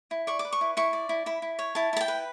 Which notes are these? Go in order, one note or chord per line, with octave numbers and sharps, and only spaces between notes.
E4
D5 C#6
D6
B4
C#6
E4
E4 C#6
D5
E4
E4 B5
E4
C#5
E4 A5
E4 A5
G5
B4